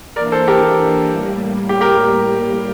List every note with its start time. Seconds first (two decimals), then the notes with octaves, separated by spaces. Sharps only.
0.16 E3 A#3 D4 A#4 D5
0.32 A4 C5
0.48 G4 A#4
1.10 A2 G3 A#3
1.69 G4
1.81 G4 A#4